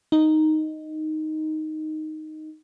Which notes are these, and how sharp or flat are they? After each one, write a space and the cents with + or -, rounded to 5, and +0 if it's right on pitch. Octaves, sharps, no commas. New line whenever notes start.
D#4 +0